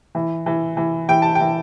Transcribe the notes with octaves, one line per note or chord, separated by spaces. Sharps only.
E3
E3
E3
E3 G5
A5
E3 G5